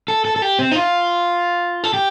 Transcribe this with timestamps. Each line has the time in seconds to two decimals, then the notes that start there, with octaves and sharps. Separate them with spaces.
0.08 A4
0.25 A4
0.36 A4
0.42 G4
0.59 C4
0.71 D#4
0.76 F4
1.84 A4
1.94 G4